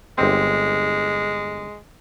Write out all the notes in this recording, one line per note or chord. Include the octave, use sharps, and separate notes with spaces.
G1 G#3 C4